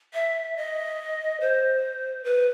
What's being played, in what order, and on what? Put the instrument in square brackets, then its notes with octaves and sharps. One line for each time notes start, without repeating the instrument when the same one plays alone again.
[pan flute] E5
D#5
C5
B4